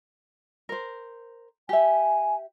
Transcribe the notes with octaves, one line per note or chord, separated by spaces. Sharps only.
A#4 C5
G4 E5 G#5